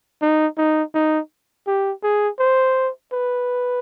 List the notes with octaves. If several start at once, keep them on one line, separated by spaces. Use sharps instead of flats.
D#4
D#4
D#4
G4
G#4
C5
B4